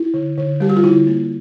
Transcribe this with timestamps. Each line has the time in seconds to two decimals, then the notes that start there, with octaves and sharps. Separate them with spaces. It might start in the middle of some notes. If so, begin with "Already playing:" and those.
Already playing: E4
0.14 D3
0.38 D3
0.60 G3 G4
0.70 F#4
0.77 F4
0.83 D3 E4
1.07 A#3